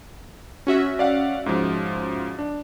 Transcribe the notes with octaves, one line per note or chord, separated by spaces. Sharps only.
C#4 F#4 E5
D5 F5 F#5
G#2 F3
D4